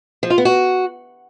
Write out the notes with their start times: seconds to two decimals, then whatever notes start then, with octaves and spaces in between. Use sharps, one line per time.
0.23 F3
0.30 F4
0.38 B3
0.45 F#4